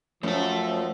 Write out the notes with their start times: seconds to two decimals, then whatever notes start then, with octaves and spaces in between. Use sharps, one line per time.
0.23 F#2 F3 A3 A5